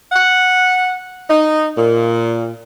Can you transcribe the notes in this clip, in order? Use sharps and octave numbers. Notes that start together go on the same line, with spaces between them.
F#5
D#4
A#2